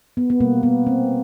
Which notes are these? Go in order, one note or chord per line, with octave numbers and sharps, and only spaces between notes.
B3
B3
B2 G3 A#3
B3
C4